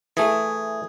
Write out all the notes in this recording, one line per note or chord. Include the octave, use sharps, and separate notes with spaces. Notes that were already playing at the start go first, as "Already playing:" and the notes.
E3 A3 G#4